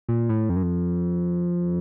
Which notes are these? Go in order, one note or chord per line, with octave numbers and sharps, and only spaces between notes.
A#2
A2
F2
F#2
F2